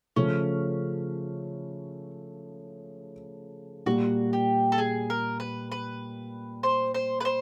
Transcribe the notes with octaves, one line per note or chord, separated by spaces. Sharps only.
C#3 F3 A3 C#4
A#2 G3 A#3 F#4
G4
A4
G#4
A#4
B4
B4
C5
C5
B4
C5